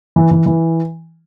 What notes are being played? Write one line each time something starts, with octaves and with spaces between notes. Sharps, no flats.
E3
E3
E3